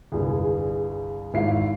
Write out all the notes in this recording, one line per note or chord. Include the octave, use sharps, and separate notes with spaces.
G1 C2 G#4
G#1 E4 E5 F5 C7